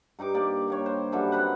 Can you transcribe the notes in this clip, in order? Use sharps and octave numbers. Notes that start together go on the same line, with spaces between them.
G2 D#4 G4 D6
A#3 G4 D5
D#3 A#3 C#5
C5
F#2 D3 G3 E5
C4 D#4 B4 F#5